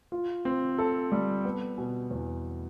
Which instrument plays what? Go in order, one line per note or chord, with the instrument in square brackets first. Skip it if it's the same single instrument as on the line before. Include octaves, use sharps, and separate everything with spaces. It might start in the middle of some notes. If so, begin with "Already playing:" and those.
[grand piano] F4
C4
A4
G3
B3
B2
E2